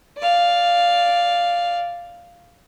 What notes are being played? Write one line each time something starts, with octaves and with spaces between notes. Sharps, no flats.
D5 F5